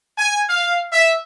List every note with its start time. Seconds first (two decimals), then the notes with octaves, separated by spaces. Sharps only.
0.18 G#5
0.49 F5
0.93 E5